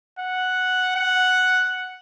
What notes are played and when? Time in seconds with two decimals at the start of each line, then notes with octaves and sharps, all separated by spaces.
0.19 F#5
0.96 F#5